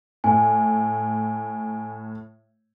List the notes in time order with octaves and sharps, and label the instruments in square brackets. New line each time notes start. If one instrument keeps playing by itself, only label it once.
[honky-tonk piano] A2 [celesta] G#5